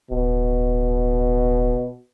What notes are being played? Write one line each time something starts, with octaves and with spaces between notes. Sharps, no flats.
D1 B2